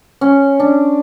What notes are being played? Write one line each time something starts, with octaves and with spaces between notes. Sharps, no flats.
C#4
D4